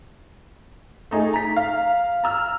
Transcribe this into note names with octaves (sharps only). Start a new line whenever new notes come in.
A3 D#4 G#4
A#5 B6
F5
A#5 E6 F6